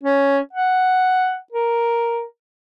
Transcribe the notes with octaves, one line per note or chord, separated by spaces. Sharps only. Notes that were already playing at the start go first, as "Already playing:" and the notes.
C#4
F#5
A#4